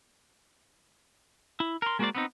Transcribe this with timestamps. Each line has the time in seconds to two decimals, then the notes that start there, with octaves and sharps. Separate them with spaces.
1.60 E4
1.82 A#4 C6
1.99 G#3 A#3 F#4 A#4 C5 D5
2.15 B3 C4 D#4